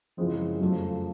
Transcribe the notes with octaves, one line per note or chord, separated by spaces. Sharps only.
F#2 C#3 E3 F3 G#3 C4
F2 C#3 F3 F#3 A3